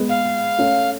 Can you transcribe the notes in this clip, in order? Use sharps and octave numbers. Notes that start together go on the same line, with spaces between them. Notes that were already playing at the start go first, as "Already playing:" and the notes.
Already playing: G#3 B3
F5
A3 C#4